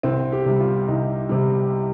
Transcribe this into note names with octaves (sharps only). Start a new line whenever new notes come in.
C2 C4
G4
C3 G3
F4
C2 D#4
C3 G3